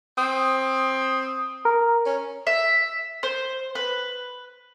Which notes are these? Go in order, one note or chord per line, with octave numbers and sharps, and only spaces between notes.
C4 D#6
A#4
C#4
E5
C5
B4